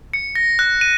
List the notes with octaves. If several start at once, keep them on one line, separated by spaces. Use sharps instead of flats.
C#7
A#6
F#6
D#7